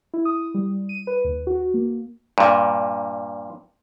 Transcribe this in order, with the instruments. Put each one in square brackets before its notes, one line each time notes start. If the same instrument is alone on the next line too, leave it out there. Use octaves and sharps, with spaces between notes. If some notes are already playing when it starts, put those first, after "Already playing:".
[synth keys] E4
D#6
G3
D#7
B4
D#2
F#4
A#3
[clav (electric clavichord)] G2 A#2